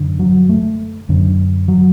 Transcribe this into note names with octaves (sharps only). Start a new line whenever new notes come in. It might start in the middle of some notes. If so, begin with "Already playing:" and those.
Already playing: F#2 D3
F#3
A3
F#2 D3
F#3